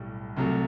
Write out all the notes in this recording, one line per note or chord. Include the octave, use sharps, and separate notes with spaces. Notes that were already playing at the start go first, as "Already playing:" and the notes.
Already playing: B1 A2 G3
C2 C3 F#3 A3